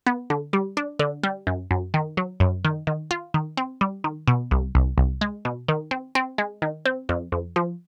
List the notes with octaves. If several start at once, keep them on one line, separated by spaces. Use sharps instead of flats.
B3
D3
G3
D4
D3
G3
F#2
F#2
D#3
F#3
F#2
D#3
D#3
F4
D#3
C4
G3
D#3
B2
C2
C2
C2
G#3
B2
D#3
C4
C4
G#3
D#3
C4
F2
F2
F3